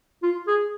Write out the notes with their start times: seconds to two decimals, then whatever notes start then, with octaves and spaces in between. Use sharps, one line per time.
0.23 F4
0.47 G#4